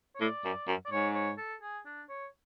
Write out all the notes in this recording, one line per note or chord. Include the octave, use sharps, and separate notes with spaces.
C#5
A2 D5
F#2
F#2
D5
G#2 C#5
C#5
A4
G#4
D4
C#5